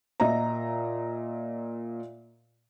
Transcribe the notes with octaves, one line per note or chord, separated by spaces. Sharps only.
A#2 D#5 E5 A#5